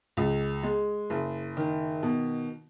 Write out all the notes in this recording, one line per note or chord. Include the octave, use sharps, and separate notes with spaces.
C#2
G#3
F#1
D#3
B2